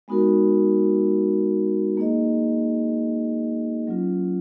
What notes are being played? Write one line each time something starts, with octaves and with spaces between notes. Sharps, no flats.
G#3 B3 D#4 F#4 A#4
A#3 D#4 G#4 D#5
F#3 C#4 F4